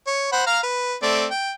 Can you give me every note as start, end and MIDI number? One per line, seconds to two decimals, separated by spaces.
0.07 0.30 73
0.32 0.44 72
0.32 0.44 78
0.32 0.44 83
0.46 0.60 77
0.46 0.60 82
0.46 0.60 89
0.63 0.95 71
1.02 1.26 57
1.02 1.26 60
1.02 1.26 74
1.31 1.53 79